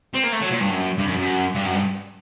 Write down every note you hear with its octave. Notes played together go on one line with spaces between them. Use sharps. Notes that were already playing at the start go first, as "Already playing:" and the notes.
C4
A#3
A3
F#3
A#2
G2
F#2
G2
F#2
F#2
G2
F#2
G2